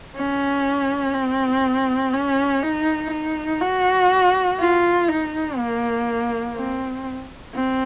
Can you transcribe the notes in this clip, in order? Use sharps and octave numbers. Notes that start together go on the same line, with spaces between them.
C#4
C4
C#4
D#4
D#4
F#4
F4
D#4
A#3
C4
C4